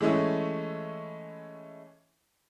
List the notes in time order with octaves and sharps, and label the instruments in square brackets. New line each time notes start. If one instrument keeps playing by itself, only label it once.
[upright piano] E3 G#3 A3 C#4 E4